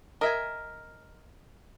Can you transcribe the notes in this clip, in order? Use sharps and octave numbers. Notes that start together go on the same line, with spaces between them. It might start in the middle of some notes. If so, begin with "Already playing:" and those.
A#4 D#5 E5 G#5